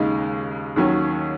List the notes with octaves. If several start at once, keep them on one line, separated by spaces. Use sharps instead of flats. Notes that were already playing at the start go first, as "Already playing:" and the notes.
Already playing: D#2 C#3 G#3 D#4
D#2 D#3 F#3 C#4